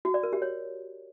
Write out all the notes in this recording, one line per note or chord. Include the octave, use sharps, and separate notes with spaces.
F#4
D5
A#4
G4
C#5